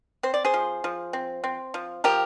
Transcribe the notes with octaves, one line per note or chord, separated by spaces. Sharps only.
C4 C5
D5
G#4 C5
F3
F3
C4
C4
F3
F3 G4 A#4